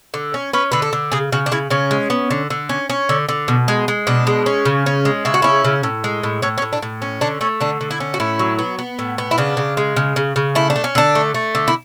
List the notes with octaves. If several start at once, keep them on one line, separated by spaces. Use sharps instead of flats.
D3
C#4
C#4 B4
D3 B4
A4
D3
C#3 G#4
C#3 F#4
D4
C#3 E4
C#3 C#4
G#3
B3
D3
D3
C#4
C#4
D3
D3
B2
G#3
G#3
B2 D4
G#3
C#4
C#3
C#4
G#3
C#3 E4
F#4
C#4 E4
C#3
A2
G#3
A2
A2 C#4
C#4
A2
D4
A2
C#4
D3 D4
A3 C#4
D3 D4
D3
E4
C#4
F#4
A2 E4
F#3
B3
B3
A2
B3
E4
C#3 D4
C#3
G#3
C#3
C#3
C#3
A3 E4
D4
A3
C#4
D3 D4
A3
A3
D3
E4